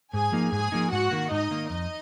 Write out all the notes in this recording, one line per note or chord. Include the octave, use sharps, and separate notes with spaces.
G#2 G#4 G#5
F3 A#3 D#4
G#2 G#4 G#5
F3 A#3 D#4
G#2 F#4 F#5
D#3 A#3
G#2 D#4 D#5
D#3 A#3
F2 D#4 D#5